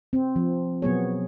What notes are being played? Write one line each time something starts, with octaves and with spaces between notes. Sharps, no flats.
C4
F3
B2 F#3 B3 G#4 C#5